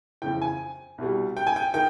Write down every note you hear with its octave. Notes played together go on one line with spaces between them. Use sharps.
F2 C#3 E3 G5
G#5
C2 B2 G3
G5
G#5
G5
D#3 G5